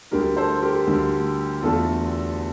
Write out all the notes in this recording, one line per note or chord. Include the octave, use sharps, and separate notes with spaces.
D2 D3 G3 G4 A#4
A4 C5
G4 A#4
D2 D3 G3
E2 D3 A3 F4 A4